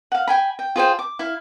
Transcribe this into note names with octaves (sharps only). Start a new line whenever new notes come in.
F5 F#5
G5 G#5 B5
G5
F4 G#4 C5 G5
D6
E4 F5